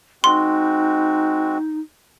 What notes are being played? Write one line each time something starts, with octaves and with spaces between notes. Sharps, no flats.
G#3 C4 D#4 F#4 C6